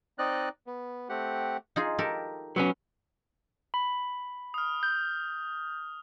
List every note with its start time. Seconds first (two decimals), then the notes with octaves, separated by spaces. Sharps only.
0.19 C4 D#4 D5 D#5 F#6
0.67 B3
1.09 A3 C4 G4 F#5
1.76 D#4 F4 G#4
1.98 G4 A4 A#4
2.56 F#3 B3 C#4
3.74 B5
4.54 D#6 F6
4.83 G6